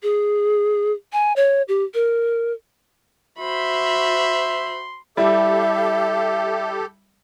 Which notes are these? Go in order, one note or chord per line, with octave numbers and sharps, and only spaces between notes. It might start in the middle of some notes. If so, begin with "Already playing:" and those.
G#4
G#5
C#5
G4
A#4
F#4 C5 E5 B5 C6
G3 E4 G4 A4 E5